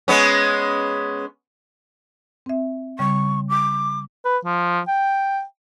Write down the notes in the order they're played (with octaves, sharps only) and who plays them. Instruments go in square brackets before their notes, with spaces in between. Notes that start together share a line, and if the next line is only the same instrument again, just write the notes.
[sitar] G#3 B3 C#4
[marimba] C4 E5
[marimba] C#3 G3 [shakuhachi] C#6
[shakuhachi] D6
[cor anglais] B4
F3
G5